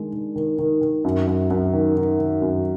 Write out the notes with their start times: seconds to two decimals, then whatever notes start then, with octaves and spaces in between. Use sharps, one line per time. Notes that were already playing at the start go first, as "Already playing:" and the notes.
Already playing: D#3 G#3 D4
0.13 D#3
0.36 D#3
0.59 D#3
0.81 D#3
1.05 F#2
1.27 F#2
1.50 F#2
1.73 D#3
1.96 D#3
2.19 D#3
2.42 F#2